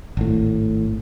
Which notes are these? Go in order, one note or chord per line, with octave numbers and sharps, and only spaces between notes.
G#1 A2